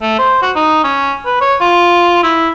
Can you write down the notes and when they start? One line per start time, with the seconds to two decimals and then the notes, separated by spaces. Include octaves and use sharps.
0.02 A3
0.19 C5
0.42 F#4
0.56 D#4
0.84 C#4
1.26 B4
1.41 C#5
1.61 F4
2.23 E4